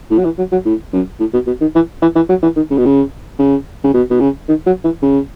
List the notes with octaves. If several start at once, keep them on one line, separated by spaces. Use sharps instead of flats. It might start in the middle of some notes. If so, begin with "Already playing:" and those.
A2
F#3
E3
F#3
F#3
A2
F#2
A2
B2
B2
D#3
E3
E3
E3
F#3
E3
D#3
C#3
B2
C#3
C#3
C#3
B2
B2
C#3
D#3
F#3
E3
C#3